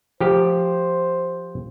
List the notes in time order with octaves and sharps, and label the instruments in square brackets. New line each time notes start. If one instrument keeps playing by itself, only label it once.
[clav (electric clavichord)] F3 G4 [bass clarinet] C5